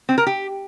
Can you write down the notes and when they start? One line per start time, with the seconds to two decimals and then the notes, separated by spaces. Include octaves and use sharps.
0.09 C4
0.18 A#4
0.27 G4